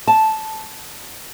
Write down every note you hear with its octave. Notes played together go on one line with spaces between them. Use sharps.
A5